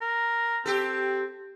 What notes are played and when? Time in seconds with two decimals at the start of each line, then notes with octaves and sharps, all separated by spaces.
0.01 A#4
0.66 C4 G4 A4